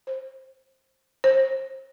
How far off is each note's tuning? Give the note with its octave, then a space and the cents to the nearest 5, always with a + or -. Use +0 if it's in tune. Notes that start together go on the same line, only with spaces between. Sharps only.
C5 +15
C5 +25